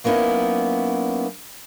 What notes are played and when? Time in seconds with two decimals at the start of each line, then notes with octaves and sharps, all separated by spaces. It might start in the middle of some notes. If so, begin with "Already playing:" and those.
0.04 F#3 A#3 B3 C#4 D#4 E4